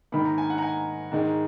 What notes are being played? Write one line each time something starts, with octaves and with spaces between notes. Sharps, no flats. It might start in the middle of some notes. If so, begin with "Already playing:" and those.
G#2 D#3 A#3 B5
A#5
G#5
F#5
A#5
G#5
G#2 D#3 G#3